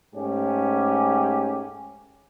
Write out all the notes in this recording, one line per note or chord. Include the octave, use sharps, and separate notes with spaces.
G#2 A3 C#4 G4